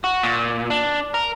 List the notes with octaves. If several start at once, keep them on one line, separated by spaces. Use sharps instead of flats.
F#4
A#2
D4
A#4